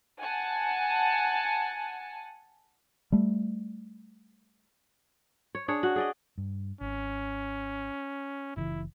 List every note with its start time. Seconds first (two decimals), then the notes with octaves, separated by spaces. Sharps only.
0.20 F#5 G#5 A5
3.12 G3 A3
5.55 C#5
5.68 D4 G#4 C#5
5.83 F#4
5.96 G#4 D5 D#5
6.38 G2
6.81 G#1 C#4
8.57 F#1 C#3 E3 E4